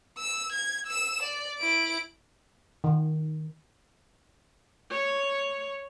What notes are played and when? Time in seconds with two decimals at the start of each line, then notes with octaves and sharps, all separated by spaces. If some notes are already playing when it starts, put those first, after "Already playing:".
0.18 E6
0.53 G#6
0.87 E6 E7
1.23 D5
1.59 E4 D7
2.84 D#3
4.91 C#5